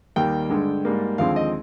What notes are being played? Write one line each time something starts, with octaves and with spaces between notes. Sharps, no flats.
D#2 D#3 G3 A#3 G5
G2 D3 G#3
G#2 G3 A#3
D#2 D3 F3 G#3 C4 F5
D#5